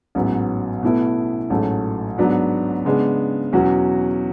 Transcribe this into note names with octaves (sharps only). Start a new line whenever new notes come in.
A1 G#2 F#3 B3
B2 A3 E4 B4
A1 G#2 F#3 A3
G#2 F#3 B3 D4 F#4
C#3 G#3 B3 D4
E2 B2 F#3 C#4 F#4